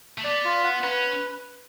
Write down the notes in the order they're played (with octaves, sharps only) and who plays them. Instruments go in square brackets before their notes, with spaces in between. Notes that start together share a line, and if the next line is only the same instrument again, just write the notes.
[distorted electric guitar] A3
[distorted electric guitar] B3 [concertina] D5
[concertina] F4
F#5
[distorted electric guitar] C#4 [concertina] B4